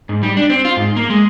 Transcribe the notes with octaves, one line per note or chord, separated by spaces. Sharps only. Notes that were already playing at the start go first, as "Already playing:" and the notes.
G#2
G3
D4
C4
F4
G#2
A#3
G#3